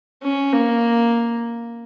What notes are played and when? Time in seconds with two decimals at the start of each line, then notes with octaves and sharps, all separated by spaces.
0.23 C#4
0.53 A#3